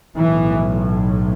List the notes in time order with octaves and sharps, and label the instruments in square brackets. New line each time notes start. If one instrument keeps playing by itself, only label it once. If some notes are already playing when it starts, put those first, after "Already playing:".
[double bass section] B1 A2 E3